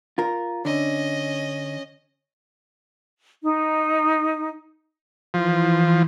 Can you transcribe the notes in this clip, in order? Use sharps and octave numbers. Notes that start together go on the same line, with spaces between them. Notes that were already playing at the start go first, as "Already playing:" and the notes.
F4 A#4
D3 C#4 D#5
D#4
E3 F3